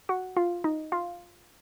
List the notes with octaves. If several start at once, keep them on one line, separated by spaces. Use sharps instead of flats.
F#4 F#5
F4 F5
D#4 D#5
F4 F5